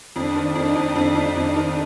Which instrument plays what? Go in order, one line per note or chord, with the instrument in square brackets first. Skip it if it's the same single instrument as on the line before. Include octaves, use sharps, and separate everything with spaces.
[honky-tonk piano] F2 [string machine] D4
[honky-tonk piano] D#3
[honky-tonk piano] F2 [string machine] D#4
[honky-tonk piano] F2
[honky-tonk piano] F2 [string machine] D#4
[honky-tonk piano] F2
[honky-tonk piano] F2 [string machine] D#4
[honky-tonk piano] D#3